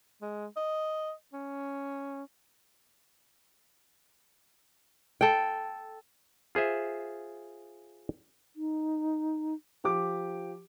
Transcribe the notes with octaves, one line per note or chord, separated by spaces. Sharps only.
G#3
D#5
C#4
A4 G5
F4 G#4 C5 E5
D#4
F3 G4 D6